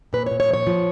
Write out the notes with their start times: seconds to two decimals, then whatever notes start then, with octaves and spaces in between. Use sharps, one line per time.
0.13 A#2 B4
0.26 C#5
0.31 A#2
0.40 C#5
0.50 F3 C#5
0.67 F3